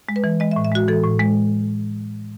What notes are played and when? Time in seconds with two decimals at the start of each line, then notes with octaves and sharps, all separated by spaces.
0.09 G#3
0.16 B4
0.24 E3
0.40 G#3 D#5
0.51 E5
0.56 A2
0.65 E5
0.72 G#3 F#4
0.88 E3 A4
1.04 A2
1.19 G#3